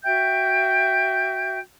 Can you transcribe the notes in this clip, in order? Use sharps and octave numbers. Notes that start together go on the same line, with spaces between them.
F#4 E5 G5 G6